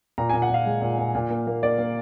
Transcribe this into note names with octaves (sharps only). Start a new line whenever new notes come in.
A#2 A#5
G#5
A#2
F#5
A#2 F5
G#3
A#2
A#2
A#2
A#3
A#3
A#3 D5
A#3